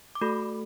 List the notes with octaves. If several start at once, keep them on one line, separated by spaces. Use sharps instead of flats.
D6
A3 F#4 A4 B5